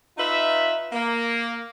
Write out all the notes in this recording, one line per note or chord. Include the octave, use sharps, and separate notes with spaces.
D#4 F4 B4 E5
A#3